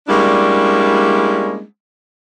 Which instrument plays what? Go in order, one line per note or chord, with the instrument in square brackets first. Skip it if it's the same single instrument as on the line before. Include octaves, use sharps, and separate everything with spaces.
[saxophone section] G3 G#3 A#3 C#4 D4 E4